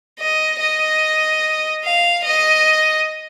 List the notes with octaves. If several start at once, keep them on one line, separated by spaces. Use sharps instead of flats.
D#5
D#5
F5
D#5